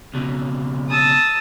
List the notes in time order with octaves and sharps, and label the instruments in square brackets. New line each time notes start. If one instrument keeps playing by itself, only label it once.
[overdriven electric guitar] C#2 B2
[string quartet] A5 D#6 E6